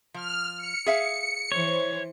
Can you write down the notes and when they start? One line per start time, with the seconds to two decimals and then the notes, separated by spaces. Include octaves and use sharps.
0.14 F3 F6
0.57 C#7
0.86 G#4 E5 F5
1.52 E3 C5 C#5